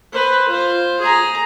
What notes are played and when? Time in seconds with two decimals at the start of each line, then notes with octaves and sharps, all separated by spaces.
0.13 B4 C5
0.48 F4 C5
1.01 G#4 A#5